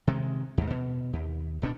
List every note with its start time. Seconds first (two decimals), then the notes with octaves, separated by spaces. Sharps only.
0.07 C3 D#3 G#3
0.58 D#2 G#2
0.70 B2
1.13 D#2
1.62 D1 B2 C4 D4